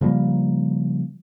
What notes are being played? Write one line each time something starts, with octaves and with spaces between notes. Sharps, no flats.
C#3 F3 G3 A#3